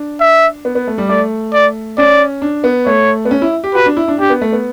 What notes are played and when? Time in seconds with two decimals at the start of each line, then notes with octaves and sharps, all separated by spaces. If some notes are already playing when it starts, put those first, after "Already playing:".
Already playing: D4
0.21 E5
0.65 B3
0.75 B3
0.87 A3
0.98 G3
1.09 A3 D5
1.53 D5
1.98 C#4 D5
2.42 D4
2.64 B3
2.86 A3 C#5
3.25 B3
3.31 C#4
3.42 E4
3.64 G4
3.74 F#4 B4
3.86 D4
3.97 E4
4.08 D4
4.19 D4 G4
4.30 B3
4.41 A3
4.53 B3